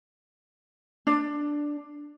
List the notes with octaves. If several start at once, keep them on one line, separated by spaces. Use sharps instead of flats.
D4